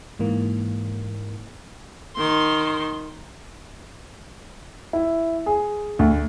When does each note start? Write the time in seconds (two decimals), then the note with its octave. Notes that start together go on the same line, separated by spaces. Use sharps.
0.19 G#2 E3 A#3
2.16 D#3 C6
4.93 E4
5.46 G#4
5.99 D2